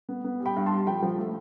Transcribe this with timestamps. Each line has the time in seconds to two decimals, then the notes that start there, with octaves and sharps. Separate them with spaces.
0.09 B3
0.24 B3
0.40 G3
0.46 G5 B5
0.56 G2
0.66 A5 C6
0.71 G3
0.87 F3 G5 B5
1.02 F3
1.18 A3